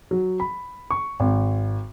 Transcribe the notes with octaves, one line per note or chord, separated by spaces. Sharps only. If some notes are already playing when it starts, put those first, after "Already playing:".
F#3
B5
C#6
G#1